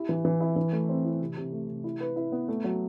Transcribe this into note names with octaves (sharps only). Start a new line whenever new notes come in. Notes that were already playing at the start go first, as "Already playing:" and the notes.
Already playing: E4 G4
E3
E3
E4
E3
A3
C4
E4
C3
C3
A3
C3
E4
B4
E4
B3
A3
F#3